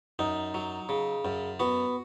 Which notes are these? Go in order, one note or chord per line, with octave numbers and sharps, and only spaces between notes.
F#2 D#4
F#3
C#3
F#2
B3 F#4